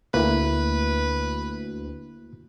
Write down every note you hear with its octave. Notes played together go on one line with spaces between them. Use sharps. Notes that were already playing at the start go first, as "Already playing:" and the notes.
D2 A#3 E4 B4